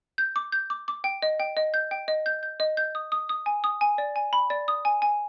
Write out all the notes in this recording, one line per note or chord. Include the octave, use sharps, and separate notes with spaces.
G6
D6
G6
D6
D6
G5
D#5
G5
D#5
G6
G5
D#5
G6
G6
D#5
G6
D#6
D#6
D#6
G#5
D#6
G#5
D5
G#5
B5
D5
D#6
G#5
G#5